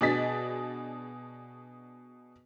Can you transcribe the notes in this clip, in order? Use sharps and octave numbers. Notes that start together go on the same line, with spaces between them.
B2 D4 G#4 D#5 A6 B6